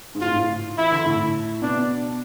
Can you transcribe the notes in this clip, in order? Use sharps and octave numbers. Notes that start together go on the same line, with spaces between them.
G#2
A2 F4
G#2
A2
E3 E4
D3
A2
B2 D4